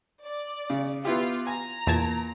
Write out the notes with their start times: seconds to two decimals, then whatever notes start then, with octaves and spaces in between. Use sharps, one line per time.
0.23 D5
0.70 C#3
1.05 B3 E4 F4 G4
1.47 G#5 A#5
1.87 E2 A#2 A5 G#6